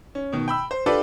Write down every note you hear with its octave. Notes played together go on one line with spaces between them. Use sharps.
C#4
B2 D#3
G5 B5 E6
C5
D4 F4 G4 A4 B4 D5